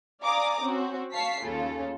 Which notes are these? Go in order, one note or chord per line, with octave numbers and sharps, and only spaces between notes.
D5 F5 G#5 A#5 D6 D#6
C4 C#4 F#4
F5 A5 C#6 B6 C7
D#2 C#3 F4 A4